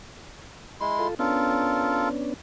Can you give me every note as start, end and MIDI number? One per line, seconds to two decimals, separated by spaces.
0.81 1.08 56
0.81 1.08 64
0.81 1.08 84
0.99 1.15 65
0.99 1.15 69
1.19 2.34 59
1.19 2.34 61
1.19 2.34 62
1.19 2.09 65
1.19 2.09 69
1.19 2.09 70